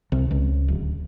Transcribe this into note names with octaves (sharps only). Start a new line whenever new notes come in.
C2
C#2
D1